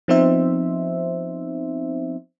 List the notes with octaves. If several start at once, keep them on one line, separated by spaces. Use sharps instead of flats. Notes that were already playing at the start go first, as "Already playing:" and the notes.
F3 B3 C4 D#4 C5 E5